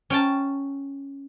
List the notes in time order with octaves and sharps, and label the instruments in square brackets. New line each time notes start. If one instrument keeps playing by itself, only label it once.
[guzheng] C#4 G5 A5